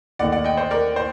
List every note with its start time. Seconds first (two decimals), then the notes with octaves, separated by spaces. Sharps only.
0.19 D#2 D#3 A3 D5 F#5
0.32 D5 F#5
0.44 D#5 G5
0.57 C5 D#5
0.71 A#4 D5
0.96 C5